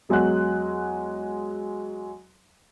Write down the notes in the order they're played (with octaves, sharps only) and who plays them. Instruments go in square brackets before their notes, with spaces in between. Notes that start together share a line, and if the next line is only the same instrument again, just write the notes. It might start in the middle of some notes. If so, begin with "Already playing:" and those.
[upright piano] E2 F#3 G#3 F#5 F#6